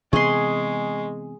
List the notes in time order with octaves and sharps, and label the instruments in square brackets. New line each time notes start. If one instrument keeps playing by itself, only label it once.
[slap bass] C3 E3 B3 [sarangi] G#3 [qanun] G#4 C6 [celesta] C#6 C7